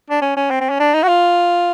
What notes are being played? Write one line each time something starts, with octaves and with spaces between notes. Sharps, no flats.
D4
C#4
C#4
C4
C4
C#4
D4
D#4
F#4
F4